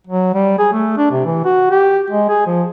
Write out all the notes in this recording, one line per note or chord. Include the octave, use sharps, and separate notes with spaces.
F#3
G3
G#4
A3
D4
C3
E3
F#4
G4
G#3
G#4
F3